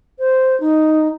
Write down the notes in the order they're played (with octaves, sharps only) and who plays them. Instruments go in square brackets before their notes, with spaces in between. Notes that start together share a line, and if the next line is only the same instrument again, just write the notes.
[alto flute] C5
D#4